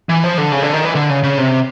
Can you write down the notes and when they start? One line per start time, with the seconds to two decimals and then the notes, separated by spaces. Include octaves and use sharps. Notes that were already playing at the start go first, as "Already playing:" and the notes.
0.09 E3
0.24 F3
0.38 D3
0.52 C#3
0.63 D3
0.73 D#3
0.85 E3
0.95 D3
1.10 C#3
1.23 C#3
1.38 C3